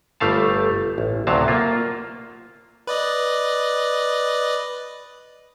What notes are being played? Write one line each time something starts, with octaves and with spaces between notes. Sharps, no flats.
G1 G3 A3 F5 A5
A1
D2 C3 F#3 F5 A5
A#3 F4
B4 D5 D#5